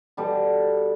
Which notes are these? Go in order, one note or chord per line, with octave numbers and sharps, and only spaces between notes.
B2 G3 A4